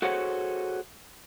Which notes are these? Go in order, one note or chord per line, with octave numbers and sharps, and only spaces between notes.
F#4 G#4 A4 C5 C#5 F#5